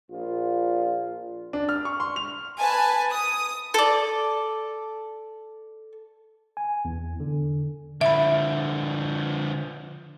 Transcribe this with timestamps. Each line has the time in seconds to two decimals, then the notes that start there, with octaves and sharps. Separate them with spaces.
0.10 A#1 A#2 F4
1.53 D4
1.69 F6
1.85 C#6
2.00 C6
2.16 F7
2.59 B4 G#5 A5
3.11 D#6
3.74 A4 D5
6.57 G#5
6.85 E2
7.20 D3
8.01 D3 F3 E5 B5